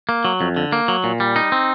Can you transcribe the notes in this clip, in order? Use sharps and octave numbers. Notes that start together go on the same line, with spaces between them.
A#3
F#3
F2
D3
A#3
F#3
A#2
G3
D#4
C4